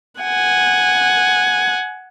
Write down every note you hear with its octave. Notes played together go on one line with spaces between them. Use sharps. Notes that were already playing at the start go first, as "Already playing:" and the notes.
F#5 G#5